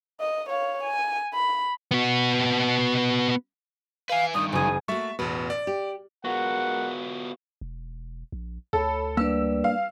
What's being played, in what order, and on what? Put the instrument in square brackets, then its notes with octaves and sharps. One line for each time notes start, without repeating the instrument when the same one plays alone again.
[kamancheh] D#5
C#5 F5
G#5
B5
[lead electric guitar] B3 F#4
[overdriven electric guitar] B4 G#5 [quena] F5
[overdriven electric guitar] G2 D#3 [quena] D#6
[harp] F#1 G#4 [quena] G#5
[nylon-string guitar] A3 A#3 F#4 [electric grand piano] E5 C#6
[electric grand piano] A1 B2 [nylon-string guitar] E2 F#4 B4
[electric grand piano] D5
[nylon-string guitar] G4
[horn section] G#3 A#4 F#5 [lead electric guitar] B3 F4 [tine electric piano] F#4
[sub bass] E1
A#1
[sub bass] D2 [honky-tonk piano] A4 [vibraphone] C#5 B5
[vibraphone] G3 B4 D5 [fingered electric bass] A#3 D4 [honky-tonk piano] E6
[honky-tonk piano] F5